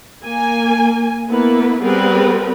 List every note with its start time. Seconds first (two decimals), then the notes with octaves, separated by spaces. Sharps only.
0.24 A#3 G#5
1.28 A#3 B3 E4 B4
1.80 G3 B3 C4 G#4 A#4 B4